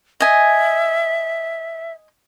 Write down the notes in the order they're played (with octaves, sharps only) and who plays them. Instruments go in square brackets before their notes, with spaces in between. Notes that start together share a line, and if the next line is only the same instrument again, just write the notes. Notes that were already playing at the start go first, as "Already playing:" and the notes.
[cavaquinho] D#5 G#5 [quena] E5